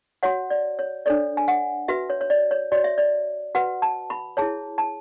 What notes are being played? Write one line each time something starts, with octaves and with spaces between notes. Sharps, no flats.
F#4 C#5 F#5
D5
C#5
D4 A4 C#5 D5
G#5
F#5
F#4 B4 E5
C#5
C#5
D5
C#5
F#4 C#5 D5
E5
D5
F#4 B4 F#5
A5
B5
E4 G#4 C#5 A5
A5